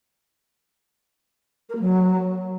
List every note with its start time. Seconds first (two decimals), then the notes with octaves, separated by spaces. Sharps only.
1.69 A#4
1.75 A#3
1.81 F#3